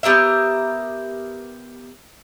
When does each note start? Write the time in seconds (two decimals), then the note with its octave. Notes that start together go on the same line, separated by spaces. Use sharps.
0.03 B3 G4 A#4 E5